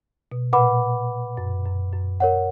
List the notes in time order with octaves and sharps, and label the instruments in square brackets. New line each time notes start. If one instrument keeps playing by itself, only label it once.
[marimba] B2
[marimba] A#2 [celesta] B4 F#5 B5 D6
[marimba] F#2
F#2
F#2
[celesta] A#4 C#5 F#5